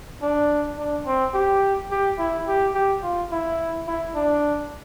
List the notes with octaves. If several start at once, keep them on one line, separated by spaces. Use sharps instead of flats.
D4
D4
C4
G4
G4
E4
G4
G4
F4
E4
E4
D4